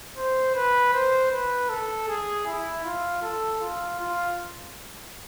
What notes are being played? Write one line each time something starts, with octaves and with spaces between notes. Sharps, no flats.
C5
B4
C5
B4
A4
G#4
E4
F4
A4
F4
F4